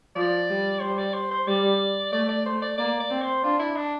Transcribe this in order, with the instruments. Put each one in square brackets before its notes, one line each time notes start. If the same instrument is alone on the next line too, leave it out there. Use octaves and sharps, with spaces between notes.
[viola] F3 [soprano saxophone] D5
[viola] G3
[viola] G3 [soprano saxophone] C5
[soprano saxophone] D5
C5
C5
[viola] G3 [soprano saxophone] D5
[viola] A3 [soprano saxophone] D5
[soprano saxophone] D5
[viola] A3 [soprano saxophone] C5
[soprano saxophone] D5
[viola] A#3 [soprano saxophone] D5
[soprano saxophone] D5
[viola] C4
[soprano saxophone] C5
[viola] D4 [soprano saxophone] F4
[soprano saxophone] E4
D4